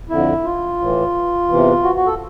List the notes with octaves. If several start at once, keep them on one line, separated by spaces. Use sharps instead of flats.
F2 D3 E4
F4
A2 E3
E2 C3 E3
F#4
F#4
A4